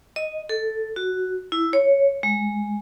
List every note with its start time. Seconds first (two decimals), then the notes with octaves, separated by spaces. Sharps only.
0.16 D#5
0.49 A4
0.96 F#4
1.52 E4
1.73 C#5
2.23 G#3